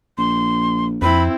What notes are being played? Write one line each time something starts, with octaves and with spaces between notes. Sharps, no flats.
A#1 C6
F2 C4 E4 B5